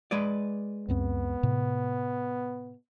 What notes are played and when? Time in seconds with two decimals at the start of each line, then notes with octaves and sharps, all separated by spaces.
0.11 G#3 B4 D5
0.88 C#2 F#2 B3 C4
1.43 A2 C3